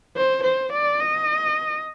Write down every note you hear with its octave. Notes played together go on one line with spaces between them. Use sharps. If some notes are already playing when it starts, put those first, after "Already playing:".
C5
C5
D5
D#5